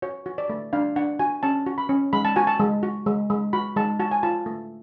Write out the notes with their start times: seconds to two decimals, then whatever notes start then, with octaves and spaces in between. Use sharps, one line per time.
0.02 F#4 C#5
0.26 F#4
0.38 D5
0.50 A3
0.73 D4 F5
0.96 D4 F#5
1.19 F#4 G#5
1.43 C#4 A5
1.66 F#4
1.78 B5
1.89 C#4
2.13 G#3 B5
2.25 A5
2.36 F#4 G#5
2.47 A5
2.60 G#3
2.83 F#4
3.06 G#3
3.30 G#3
3.53 F#4 B5
3.76 G#3 A5
4.00 F#4 A5
4.12 G#5
4.23 F4 A5
4.46 A3